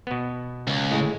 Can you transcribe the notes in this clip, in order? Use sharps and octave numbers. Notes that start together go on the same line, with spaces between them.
B2 B3
C#2
A2 G#3